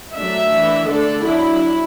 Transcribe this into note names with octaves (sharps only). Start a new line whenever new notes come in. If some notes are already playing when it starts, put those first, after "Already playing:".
F#3 A3 D4 E5
E3 D4
D3 A3 D4 A4
F#3 D4 E4